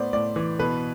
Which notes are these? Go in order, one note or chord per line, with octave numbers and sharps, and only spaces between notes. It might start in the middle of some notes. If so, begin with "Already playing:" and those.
Already playing: A2 B3 C5 D5
A2 D5
E3
B2 B4